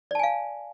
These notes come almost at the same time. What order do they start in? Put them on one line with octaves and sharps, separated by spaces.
D5 A5 G#5 F5